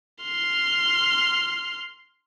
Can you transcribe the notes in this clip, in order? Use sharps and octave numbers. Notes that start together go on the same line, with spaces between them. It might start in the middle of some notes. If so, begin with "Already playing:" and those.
C6 F6